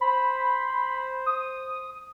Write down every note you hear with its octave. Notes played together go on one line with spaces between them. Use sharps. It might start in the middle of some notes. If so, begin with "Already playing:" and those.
C5 B5
D#6